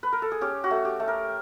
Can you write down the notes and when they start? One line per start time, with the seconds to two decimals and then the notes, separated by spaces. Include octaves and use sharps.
0.03 B4
0.13 A#4
0.22 A4
0.32 G#4
0.41 C#4 G4
0.64 F#4
0.71 A3
0.85 G4
1.00 A3
1.08 A#4